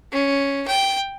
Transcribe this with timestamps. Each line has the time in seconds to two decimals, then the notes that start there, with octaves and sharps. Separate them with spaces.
0.12 C#4
0.67 G5